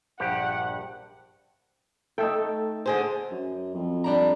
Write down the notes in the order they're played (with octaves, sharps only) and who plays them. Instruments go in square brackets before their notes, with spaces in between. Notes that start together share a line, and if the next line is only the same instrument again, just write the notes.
[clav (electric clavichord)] A#1 G2 G4 [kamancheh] F#5
[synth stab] A3 [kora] D#4 A4 G5
[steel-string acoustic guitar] D3 G#4 C5
[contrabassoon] F#2
F2
[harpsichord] G3 D4 A#5